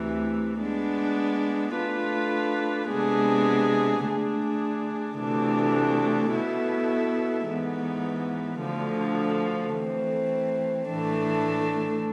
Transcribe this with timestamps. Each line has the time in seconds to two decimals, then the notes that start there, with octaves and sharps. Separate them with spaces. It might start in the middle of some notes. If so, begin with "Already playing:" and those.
Already playing: D2 C3 E3 A3
0.60 G#3 B3 D4
1.74 A3 D4 F4 B4
2.88 C3 G#3 B3 D4 G#4
4.03 D3 A3 D4 G#4
5.17 D2 C3 E3 A3 D4
6.31 B2 B3 E4 A4 E5
7.46 G#2 E3 B3
8.60 D2 D3 F3
9.74 E3 A3 C4
10.88 A2 E3 A3 D4